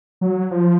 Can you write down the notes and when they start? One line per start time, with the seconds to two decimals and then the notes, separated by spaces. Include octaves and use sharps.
0.21 F#3
0.51 F3